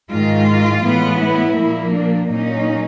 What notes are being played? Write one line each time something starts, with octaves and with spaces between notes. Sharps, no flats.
G#2 D#3 G#3 F4
A2 E3 G#3 B3
E4
A#2 F3 A#3
D4
A#2 F#3 A#3 C#4 D#4